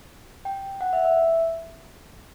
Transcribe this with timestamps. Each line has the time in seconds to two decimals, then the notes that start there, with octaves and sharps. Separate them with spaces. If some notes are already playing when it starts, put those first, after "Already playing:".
0.45 G5
0.81 F#5
0.93 E5
1.05 E5